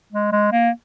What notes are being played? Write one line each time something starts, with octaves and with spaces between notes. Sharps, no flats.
G#3
G#3
A#3